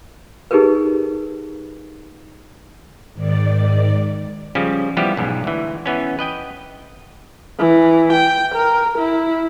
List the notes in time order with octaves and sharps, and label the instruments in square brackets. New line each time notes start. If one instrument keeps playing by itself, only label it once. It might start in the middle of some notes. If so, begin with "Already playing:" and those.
[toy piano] D#4 G4 G#4 A#4 B4
[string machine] G#2 D#3 D5
[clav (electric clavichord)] C#3 F3 G3 C#4
E3 F3 G3 B3 G4
B1 G#2
D2 E3
E3 B3 C#4
B4 D#5 G5
[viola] E3
G5
A#4
E4